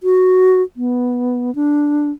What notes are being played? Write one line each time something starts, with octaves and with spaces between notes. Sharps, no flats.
F#4
B3
D4